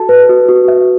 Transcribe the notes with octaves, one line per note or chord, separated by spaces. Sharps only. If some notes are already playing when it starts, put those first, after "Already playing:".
Already playing: F#4 A4 A5
B4
F#4
F#4
E5